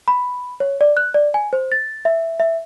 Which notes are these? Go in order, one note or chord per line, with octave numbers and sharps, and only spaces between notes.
B5
C#5
D5
F#6
D5
G#5
C5
A6
E5
E5